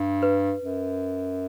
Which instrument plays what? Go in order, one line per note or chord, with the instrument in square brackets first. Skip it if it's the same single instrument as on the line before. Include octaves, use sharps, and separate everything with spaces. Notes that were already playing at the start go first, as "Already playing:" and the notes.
Already playing: [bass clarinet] G2
[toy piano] B4
[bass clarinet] F#2